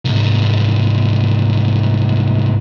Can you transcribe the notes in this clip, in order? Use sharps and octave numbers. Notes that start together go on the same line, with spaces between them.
C2 G#2